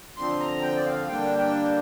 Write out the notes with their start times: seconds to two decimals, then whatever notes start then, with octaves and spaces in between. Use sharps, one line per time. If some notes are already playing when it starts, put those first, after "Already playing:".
0.17 D3 F3 C4 C6
0.40 A#5
0.62 G5
0.76 D5
0.85 F5
1.08 D3 G3 A#3 D4 G5
1.39 G5